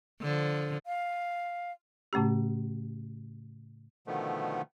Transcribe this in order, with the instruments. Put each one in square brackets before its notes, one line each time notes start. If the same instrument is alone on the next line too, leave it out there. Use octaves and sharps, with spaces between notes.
[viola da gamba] D3 F3
[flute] F5
[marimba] A2 C#3 A3 C#4 G4
[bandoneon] B2 D3 D#3 F3 A3 B3